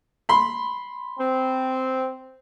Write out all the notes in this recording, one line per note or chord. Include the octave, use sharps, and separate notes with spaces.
B5 C6
C4